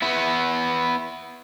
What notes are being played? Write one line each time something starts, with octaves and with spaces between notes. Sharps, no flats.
B3 E4